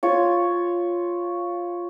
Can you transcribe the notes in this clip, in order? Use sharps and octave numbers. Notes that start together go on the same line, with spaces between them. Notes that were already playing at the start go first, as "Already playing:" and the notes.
F4 C#5